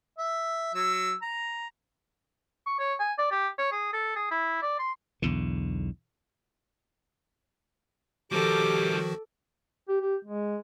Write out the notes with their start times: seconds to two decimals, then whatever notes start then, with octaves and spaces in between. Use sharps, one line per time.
0.18 E5
0.75 F#3 E6
1.22 A#5
2.67 C#6
2.79 C#5
3.00 G#5
3.18 D5
3.31 G4
3.59 C#5
3.72 G#4
3.93 A4
4.16 G#4
4.31 E4
4.62 D5
4.79 C6
5.22 B1 E2 D3
8.32 D#3 F3 G3 F#4 G4 A4 A#4 D6
9.88 G4
10.01 G4
10.25 G#3